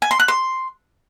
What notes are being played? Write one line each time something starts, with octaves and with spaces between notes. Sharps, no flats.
G#5
C6
F#6
C6